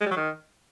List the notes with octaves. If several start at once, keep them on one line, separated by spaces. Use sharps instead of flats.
G#3
G3
F#3
D#3